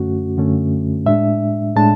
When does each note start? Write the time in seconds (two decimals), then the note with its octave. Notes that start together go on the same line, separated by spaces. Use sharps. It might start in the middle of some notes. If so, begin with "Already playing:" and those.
Already playing: F#2 D3 A3 C#4 F#4
0.37 F#2 D3 A3 C#4
1.06 A2 G#3 D4 E5
1.76 A2 G#3 D4 A5